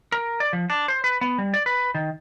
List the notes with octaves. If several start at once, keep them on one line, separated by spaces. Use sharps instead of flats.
A#4
D5
F3
D4
C5
B4
B3
G3
D5
B4
D#3